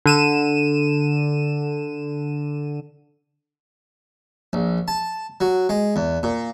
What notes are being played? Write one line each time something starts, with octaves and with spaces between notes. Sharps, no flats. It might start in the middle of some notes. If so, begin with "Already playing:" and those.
D3 D#7 E7
A#1
A5
F#3
G#3
E2
A#2